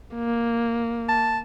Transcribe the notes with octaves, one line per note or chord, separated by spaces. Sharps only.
A#3
A5